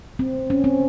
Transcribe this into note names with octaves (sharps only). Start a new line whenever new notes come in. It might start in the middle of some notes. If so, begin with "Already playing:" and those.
C4
C#4
C4